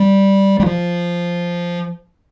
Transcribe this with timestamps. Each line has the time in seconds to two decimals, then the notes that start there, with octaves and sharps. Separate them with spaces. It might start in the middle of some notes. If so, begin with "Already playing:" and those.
Already playing: G3
0.60 G3
0.66 F3